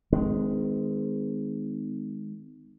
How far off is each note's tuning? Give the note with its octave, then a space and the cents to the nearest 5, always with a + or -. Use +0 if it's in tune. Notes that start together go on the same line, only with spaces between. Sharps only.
D#3 +0 G#3 +0 C4 -45